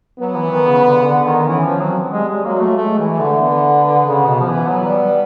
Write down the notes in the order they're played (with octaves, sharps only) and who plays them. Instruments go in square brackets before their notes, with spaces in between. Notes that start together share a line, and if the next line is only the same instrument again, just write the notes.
[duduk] F#3 [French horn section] B3
[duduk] E3
D#3
C#3
D3
C#3
D3
D#3
[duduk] E3 [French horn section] C#4
[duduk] F3
[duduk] F#3 [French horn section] C4
[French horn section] G3 [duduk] G#3
[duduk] G#3
[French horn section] F#3 [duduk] A#3
[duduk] A3
[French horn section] G#3 [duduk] A3
[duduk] E3
[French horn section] A3
[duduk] D3
[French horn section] B3
[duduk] C#3
B2
F3
E3
F#3
G3
G3